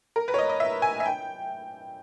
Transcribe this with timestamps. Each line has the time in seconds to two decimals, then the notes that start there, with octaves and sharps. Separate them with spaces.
0.16 A#4
0.28 B4
0.34 C#5
0.38 D#5
0.49 D#5
0.60 E5
0.82 G#5
1.00 E5
1.06 G5